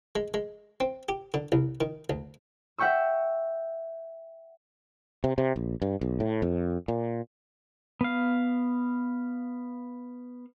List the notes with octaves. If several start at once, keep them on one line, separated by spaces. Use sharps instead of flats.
G#3
G#3
C4
G4
D3
C2
D#3
D2
E5 F#5 G5 C#6 E6
C3
C3
A#1
G2
B1
A2
F2
A#2
B3 F5